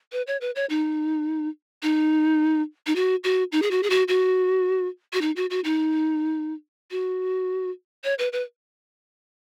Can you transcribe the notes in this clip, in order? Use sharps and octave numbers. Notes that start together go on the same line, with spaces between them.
B4
C#5
B4
C#5
D#4
D#4
D#4
F#4
F#4
D#4
G#4
F#4
G#4
F#4
F#4
F#4
D#4
F#4
F#4
D#4
F#4
C#5
B4
B4